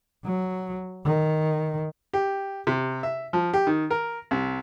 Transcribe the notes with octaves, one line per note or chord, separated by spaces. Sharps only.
F#3
D#3
G4
C3
E5
F3
G4
D#3
A#4
C2